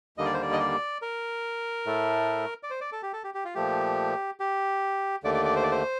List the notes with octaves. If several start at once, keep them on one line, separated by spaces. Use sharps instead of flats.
D#2 D3 G3 A#3 D#5
D5
C5
D5
D#5
D5
A#4
A2 A3
D5
C5
D5
A4
G4
A4
G4
G4
F4
A#2 F3 A3 G4
G4
D#2 D3 A3 D5
D5
D5
C5
D5
C5